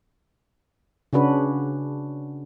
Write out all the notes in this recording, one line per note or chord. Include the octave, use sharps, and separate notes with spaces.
C#3 C#4 D4 F#4 B4